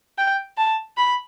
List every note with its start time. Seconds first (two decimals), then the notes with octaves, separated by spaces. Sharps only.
0.18 G5
0.57 A5
0.97 B5